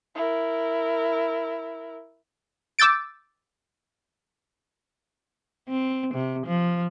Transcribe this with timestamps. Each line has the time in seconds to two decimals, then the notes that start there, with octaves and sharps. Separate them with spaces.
0.15 E4 A#4
2.79 D6 E6 G6 A6 D7
5.69 C4
6.14 C3
6.46 F3